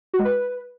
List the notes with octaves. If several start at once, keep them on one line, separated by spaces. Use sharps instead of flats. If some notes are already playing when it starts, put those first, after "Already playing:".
F#4
G#3
B4